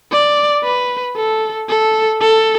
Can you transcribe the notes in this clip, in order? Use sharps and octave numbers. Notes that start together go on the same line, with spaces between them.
D5
B4
A4
A4
A4